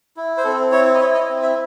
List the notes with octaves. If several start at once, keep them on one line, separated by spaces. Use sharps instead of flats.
E4
C5
C4 A4
E4 C#5
D#5
E4 C#5
D#5
C4
E5